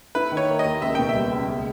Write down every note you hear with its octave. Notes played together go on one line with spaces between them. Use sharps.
E4 B4
D#3
C#5
A#3
D#5
D#2
C#2 E5
B2 G5
E5
G3
C#2
G#4